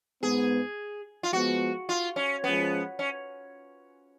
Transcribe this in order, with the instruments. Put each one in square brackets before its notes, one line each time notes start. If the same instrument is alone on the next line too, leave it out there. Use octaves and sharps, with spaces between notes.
[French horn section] G#2 G#3 B3 [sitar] G#4
[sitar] F4
[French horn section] F3 G#3 B3 [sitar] F#4
[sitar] F4
C#4
[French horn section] F3 G#3 C#4 [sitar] B3
[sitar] C#4